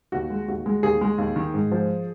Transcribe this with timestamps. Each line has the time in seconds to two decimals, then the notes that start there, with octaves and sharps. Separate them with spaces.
0.12 D#2 F#4
0.30 G#3
0.48 D#2 F#4
0.66 G#3
0.83 D#2 G#4
1.01 G#3
1.18 D#2
1.36 D#3
1.54 G#2
1.71 F3